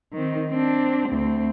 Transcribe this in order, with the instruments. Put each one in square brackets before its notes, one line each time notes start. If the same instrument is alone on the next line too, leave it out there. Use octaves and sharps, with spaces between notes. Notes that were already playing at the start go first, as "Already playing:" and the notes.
[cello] D#3 C4
C4 D4
D2 C4